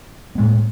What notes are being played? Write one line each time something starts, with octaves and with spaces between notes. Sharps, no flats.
A2 G#3 B3